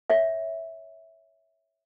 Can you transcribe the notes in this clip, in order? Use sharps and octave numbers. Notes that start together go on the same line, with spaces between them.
C#5 E5